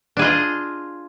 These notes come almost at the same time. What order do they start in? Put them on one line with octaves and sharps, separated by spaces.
D4 G#4 F4 D#5